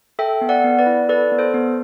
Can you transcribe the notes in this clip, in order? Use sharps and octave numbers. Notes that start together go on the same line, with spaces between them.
A4 E5 G5
B3
D5 F#5
B3
B4 D5
E4
A4 B4 D5
B3
A4 C5
B3